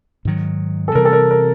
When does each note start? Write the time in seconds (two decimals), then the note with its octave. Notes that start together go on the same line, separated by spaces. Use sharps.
0.25 G#2 D#3 F#3
0.88 A4
0.95 C3 E3 G3 A#4
1.05 A4
1.13 A#4
1.31 A#4